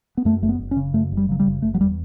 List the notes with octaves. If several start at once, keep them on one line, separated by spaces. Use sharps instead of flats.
B3
F#2 A3
F#1 A3
B3
F#1
C#4
C#3
F#2 A3
F#1
G3
C#3 F#3
G3
F#1
F#1 A3
F#3
E2 G3